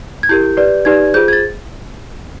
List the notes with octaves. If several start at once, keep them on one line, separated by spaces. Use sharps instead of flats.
G#6
E4 G4 A#4 G6
G4 B4 D5
D#4 G4 B4 D5 G#6
F4 G#4 C5 G6
G#6
A6